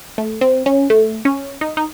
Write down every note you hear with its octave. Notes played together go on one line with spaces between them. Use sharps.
A3
C4
C#4
A3
C#4
D#4
D#4